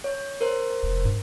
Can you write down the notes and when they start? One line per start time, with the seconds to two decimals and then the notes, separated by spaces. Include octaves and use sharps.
0.04 C#5
0.41 A#4 C5
0.83 F1
1.05 G2